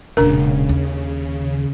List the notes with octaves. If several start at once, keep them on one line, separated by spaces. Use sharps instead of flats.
E1 A#2 C#3 D4 A#4
D#2